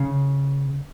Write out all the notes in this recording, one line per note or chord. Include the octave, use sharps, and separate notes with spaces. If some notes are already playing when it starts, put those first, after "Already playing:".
Already playing: C#3